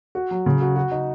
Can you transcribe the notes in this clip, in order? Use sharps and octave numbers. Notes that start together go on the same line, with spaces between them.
F#4
F#3
C#3
F#4
F#4
D#4